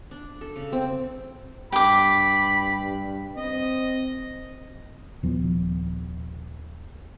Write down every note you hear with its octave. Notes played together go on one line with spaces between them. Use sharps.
D4
A4
C#3
C4
G2 G4 B5 D6
C4 D#5
D#1 F3 B3